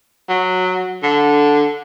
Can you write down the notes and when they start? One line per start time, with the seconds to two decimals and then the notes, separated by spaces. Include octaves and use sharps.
0.29 F#3
1.03 D3